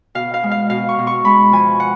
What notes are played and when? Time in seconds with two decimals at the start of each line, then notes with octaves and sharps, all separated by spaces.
0.15 B2 F5
0.34 F5
0.43 G#3
0.51 F5
0.70 B2 F5
0.89 C#6
0.98 B2
1.07 C#6
1.25 G#3 B5
1.52 F3 G#5
1.80 F#5